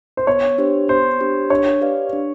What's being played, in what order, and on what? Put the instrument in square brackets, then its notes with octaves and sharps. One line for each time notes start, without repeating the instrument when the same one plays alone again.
[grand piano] C5
[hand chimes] B3 [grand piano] C#5
[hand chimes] D4 G4 C5
[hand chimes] B3 [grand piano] C5
[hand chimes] D4 G4 C5
[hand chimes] D4 [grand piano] C#5
[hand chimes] G4 B4 D5 F5
D4